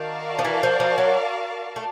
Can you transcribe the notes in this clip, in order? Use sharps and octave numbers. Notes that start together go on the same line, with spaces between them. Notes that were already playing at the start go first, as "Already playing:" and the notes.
Already playing: D#3 F#4 A#4 D5 F5 A5
F3
E3
F3
F3
F#3
A3